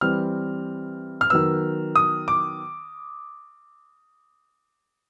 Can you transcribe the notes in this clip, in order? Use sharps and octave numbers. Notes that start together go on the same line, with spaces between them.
E3 G3 C4 F6
F6
D#3 F#3 B3 E6
D#6
D6